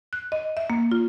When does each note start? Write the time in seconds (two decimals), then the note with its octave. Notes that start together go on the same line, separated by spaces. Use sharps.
0.13 F#6
0.32 D#5
0.57 E5
0.70 A#3
0.92 F4